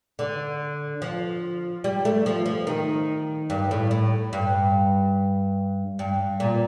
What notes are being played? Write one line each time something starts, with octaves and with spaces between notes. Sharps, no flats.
D3
F3
G3
A3
F3
F3
D#3
G2
A2
A2
G2
G2
A#2